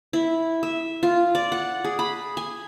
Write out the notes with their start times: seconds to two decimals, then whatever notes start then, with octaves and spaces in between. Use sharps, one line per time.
0.13 E4
0.63 E5
1.03 F4
1.35 D5
1.52 F#5
1.84 G#4
1.99 B5
2.37 G#5